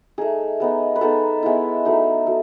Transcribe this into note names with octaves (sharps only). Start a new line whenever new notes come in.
A3 D#4 G#4
G#3 B3 D#4
B4
G#3 B3 D#4 A4
G#3 B3 E4
F#3 A3 D#4
F#3 A4